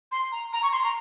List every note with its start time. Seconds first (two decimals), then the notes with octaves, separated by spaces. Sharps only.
0.12 C6
0.32 A#5
0.53 A#5
0.63 C#6
0.72 C6
0.83 A#5